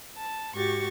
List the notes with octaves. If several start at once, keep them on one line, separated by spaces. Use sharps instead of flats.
A5
G#2 F#4 G4 C#6 A6